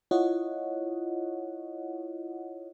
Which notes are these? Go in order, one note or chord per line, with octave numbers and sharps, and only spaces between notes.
E4 F4 C#5 D#5 F#5